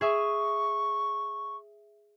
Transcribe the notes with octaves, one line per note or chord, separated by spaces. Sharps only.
G#4 E5 C#6 D#6